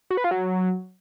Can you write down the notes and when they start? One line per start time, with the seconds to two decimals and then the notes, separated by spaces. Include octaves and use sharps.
0.10 F#4
0.17 B4
0.24 F4
0.31 F#3